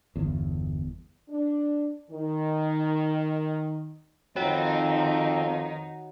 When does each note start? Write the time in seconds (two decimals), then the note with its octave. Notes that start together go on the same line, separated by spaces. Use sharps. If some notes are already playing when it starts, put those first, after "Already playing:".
0.16 G1 E2
1.29 D4
2.10 D#3
4.36 F2 D#3 C4 D#4 F#4 C#5 F#5